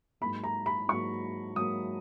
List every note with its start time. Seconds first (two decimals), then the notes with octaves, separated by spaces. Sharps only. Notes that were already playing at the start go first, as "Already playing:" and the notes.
0.21 G#2 F#3 A#3 B5
0.44 A#5
0.66 B5
0.88 G#2 F#3 A#3 C#6
1.56 G#2 F#3 A#3 D#6